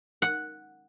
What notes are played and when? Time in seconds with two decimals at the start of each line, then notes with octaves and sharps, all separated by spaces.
0.22 F#5